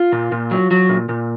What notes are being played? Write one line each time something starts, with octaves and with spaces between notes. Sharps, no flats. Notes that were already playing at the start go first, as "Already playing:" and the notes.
Already playing: F4
A#2
A#2
F#3
F#3
A#2
A#2